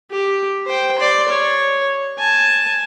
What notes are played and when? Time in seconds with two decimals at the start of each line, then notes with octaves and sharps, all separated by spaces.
0.10 G4
0.66 C5 G5
0.98 D5 C6
1.28 C#5
2.18 G#5 A5